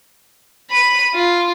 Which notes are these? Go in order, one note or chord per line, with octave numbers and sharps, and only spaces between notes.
B5 D#7
F4